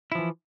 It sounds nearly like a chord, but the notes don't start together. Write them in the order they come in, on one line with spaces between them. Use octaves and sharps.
E4 F3 E3